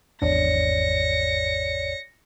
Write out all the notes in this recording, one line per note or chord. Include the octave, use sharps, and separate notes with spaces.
G#1 E2 D4 C#5 D5 A#6 C#7